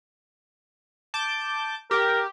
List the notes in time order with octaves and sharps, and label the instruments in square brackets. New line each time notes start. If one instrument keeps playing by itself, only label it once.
[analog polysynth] A5 D6 G6
[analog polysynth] G4 [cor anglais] A#4